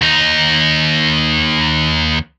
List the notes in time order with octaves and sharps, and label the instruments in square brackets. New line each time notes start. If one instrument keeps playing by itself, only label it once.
[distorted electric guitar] D#2 D#4